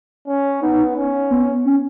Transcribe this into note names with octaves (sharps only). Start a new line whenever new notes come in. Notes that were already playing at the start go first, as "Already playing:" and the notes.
C#4
B3 D#4
C#4
B3
C#4